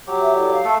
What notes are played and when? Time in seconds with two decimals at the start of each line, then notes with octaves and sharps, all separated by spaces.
0.07 F#3 G4
0.20 E5
0.34 E4 A4 D5
0.52 F5
0.65 A3 A4